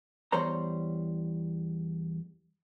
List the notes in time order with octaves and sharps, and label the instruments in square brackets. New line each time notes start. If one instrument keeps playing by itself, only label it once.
[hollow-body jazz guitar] E2 G3 C5 C#5 A#5